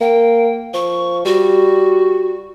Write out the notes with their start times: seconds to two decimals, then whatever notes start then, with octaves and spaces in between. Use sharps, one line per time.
0.01 A#3 G5
0.74 F3 C#6
1.25 G3 F#4